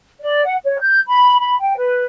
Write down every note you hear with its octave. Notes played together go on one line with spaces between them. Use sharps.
D5
F#5
C#5
G6
B5
B5
G5
B4